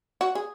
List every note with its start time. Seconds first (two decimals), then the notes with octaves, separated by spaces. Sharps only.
0.21 F#4
0.35 G#4